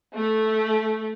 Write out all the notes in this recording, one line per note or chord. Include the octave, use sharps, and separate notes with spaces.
A3